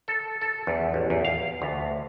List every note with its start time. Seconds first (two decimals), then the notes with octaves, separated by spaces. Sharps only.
0.08 A4
0.41 A4
0.67 E2
0.94 A1
1.10 E2
1.25 F5
1.62 D2